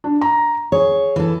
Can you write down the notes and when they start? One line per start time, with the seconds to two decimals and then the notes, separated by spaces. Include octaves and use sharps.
0.04 D4
0.21 A#5
0.72 G#4 C#5
1.16 E3 A4